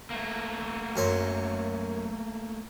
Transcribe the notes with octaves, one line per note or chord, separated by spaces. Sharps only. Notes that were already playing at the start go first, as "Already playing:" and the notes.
A3 A#3
F#2 C#5 C6